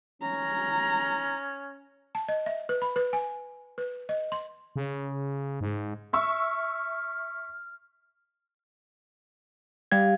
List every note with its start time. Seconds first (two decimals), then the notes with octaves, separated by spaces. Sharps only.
0.22 C#4 A#5
2.15 A5
2.29 D#5
2.46 E5
2.69 B4
2.82 B5
2.96 B4
3.13 G#5
3.78 B4
4.09 D#5
4.32 C6
4.76 C#3
5.61 G#2
6.13 E5 C#6 E6 F6
9.92 G3 G4 F5 G#6